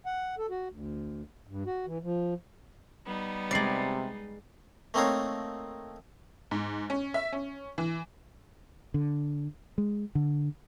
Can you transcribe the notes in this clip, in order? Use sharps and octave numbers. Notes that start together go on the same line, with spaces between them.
F#5
A4
F#4
D2
G2
F#4
E3
F3
G3 B3 D#4
C3 G#3 D5 A6 C7 F#7
A3 A#3 C4 D#4 C#5 F5
G#2
C#4
E5
C#4
E3
D3
G#3
D3